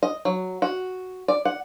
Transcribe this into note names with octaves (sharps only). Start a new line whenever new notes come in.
D#5
F#3
F#4
D5
F#5